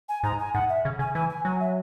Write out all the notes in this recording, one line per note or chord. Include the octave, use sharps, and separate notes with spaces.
G#5
G#2 A#5
G#5
G#2 F#5
E5
C#3
C#3 G#5
E3 G#5
G#5
F#3 G#5
E5